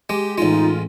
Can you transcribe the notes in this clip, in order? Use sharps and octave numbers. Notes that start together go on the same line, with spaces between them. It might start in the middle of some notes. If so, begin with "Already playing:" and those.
G#3 G4
A1 G#3 D#4 F4